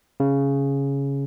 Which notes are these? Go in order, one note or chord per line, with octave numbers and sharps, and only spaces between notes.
C#3